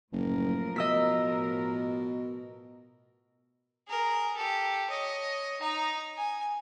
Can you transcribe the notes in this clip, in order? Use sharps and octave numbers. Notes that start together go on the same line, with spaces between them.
F#1 A2 F3 A#4
B2 D#5 E6 B6
G#4 A#4
G4 A4
C#5 D#5
D#4 A#5
G#5